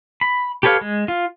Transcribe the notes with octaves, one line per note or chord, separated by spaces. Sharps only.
B5
G4 A4 B4 C#5 F5
G#3
F4